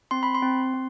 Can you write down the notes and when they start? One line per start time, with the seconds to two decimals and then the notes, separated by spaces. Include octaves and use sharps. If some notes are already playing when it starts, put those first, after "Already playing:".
0.11 C4 C6
0.23 B5
0.35 C6
0.42 C4
0.74 C4